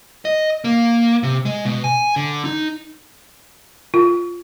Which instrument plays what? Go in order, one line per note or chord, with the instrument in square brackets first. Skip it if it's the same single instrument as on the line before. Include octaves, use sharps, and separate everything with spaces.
[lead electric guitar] D#5
A#3
C3
G#3
B2
G#5
D3
D#4
[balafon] F4